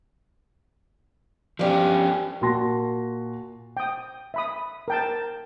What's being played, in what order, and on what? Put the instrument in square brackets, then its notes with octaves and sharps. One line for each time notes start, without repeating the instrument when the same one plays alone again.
[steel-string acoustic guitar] G2 G4 [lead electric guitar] F3 C#4
[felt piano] A#2 F#4 A5 C6 A#6
[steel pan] G5 D#6
E5 B5 D#6
A#4 G5 A5